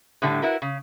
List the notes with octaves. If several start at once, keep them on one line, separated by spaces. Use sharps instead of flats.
A2 D3 E3 G3 A3
E4 F#4 A#4 B4
C#3